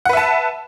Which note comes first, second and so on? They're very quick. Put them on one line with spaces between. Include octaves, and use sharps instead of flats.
F#5 B4 E5 A5